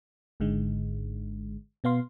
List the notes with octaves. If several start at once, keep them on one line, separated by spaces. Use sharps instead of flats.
G#1 G#2 D3 G#3
B2 B3 F5 C6